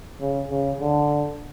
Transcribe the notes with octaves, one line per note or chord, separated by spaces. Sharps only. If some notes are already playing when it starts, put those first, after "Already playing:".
C#3
C#3
D3